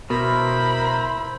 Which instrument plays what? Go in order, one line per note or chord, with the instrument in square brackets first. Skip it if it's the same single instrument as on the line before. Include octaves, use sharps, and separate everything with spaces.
[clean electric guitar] B2 [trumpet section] E4 C5 [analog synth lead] A#4 [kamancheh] B5